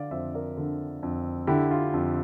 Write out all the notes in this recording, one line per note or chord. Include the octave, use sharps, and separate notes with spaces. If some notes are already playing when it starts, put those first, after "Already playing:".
Already playing: D3 D5 F5
F2 C5 E5
A#4 D5
D3
F2
D3 E4 G4
F4
F2